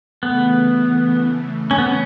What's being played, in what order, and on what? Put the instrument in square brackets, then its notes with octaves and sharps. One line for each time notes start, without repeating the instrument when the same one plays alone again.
[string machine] C#3 E3 A3 [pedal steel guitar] B3
[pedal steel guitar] C#4
B3
C#4